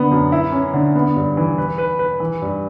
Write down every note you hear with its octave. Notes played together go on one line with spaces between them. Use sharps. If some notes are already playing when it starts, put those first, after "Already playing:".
Already playing: D3 B3
F#2
E4
C#4
D3
B3
G2
E3
B4
B4
B4
E3
G2